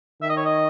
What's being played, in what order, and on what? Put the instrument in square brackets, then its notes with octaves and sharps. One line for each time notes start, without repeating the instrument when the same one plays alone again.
[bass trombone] D#3 [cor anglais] E5
[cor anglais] D#5
C#5
D#5